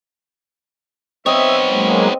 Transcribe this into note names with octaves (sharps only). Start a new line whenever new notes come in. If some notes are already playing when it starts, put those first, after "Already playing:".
B3 C4 C#5 D#5 E5
F#3 G#3 A#3